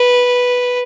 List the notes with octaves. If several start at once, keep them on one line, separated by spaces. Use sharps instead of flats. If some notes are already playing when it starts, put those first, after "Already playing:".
Already playing: B4